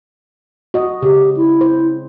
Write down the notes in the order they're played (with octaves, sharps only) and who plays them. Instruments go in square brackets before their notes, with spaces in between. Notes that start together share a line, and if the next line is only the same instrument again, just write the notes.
[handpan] F#4 D#5
[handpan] C#3 [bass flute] G4
[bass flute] E4
[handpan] C5